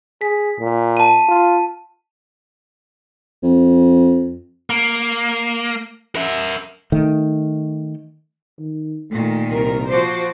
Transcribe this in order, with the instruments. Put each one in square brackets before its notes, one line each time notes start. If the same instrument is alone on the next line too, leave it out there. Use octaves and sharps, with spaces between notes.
[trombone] G#4 [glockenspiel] B6
[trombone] A#2
[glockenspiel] A5 D#7
[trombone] F4
[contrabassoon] F2
[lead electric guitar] A#3
A#4 E5
[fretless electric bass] D#3 A3
[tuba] D#3
[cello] A#2 D#3 [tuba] A3
[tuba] C2 [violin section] A#4
[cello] F3 F#4 [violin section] C5 D6